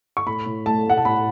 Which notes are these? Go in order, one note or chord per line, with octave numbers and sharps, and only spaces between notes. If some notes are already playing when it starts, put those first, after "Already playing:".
C#6
A2 B5
A2
A3 A5
A3 F#5
A5
A2 B5